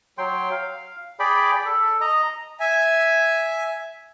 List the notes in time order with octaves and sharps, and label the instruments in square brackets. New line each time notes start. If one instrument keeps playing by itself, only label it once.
[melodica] F#3 G5 C6
F5
G#4 D5 G5 B5
A4
D#5 A#5
[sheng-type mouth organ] E5 G#5